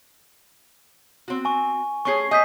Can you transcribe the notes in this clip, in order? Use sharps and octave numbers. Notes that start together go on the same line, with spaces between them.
C4 F#4
G#5 C#6
A3 C#4 G#4 C#6 C7
A3 D#5 G#5 G6 B6